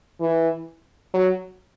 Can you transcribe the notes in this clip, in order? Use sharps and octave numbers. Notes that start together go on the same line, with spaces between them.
E3
F#3